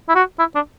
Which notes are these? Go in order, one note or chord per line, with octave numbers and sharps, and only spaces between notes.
E4
F#4
E4
D4